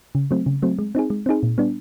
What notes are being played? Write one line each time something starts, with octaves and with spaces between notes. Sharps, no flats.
C#3
F#3 A3 C4
C#3
F#3 A3 C4
G#3
C4 D#4 G#4
G#3
C4 D#4 G#4
A#2
G3 B3 D4